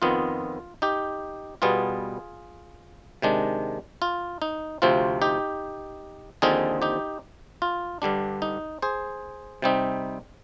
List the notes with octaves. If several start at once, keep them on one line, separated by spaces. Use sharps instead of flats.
F2 D#3 B3 F4
D#4 G4
B2 G3 B3 F4 G#4
C3 D#3 G#3 D4
F4
D#4
D2 C3 F3 C4 F4
D#4 G4
D#2 D3 F3 C4 D#4 F4 G#4
D#4 G4
F4
G2 D3 G3 D4
D#4
G#4 C5
C3 G3 C4 D#4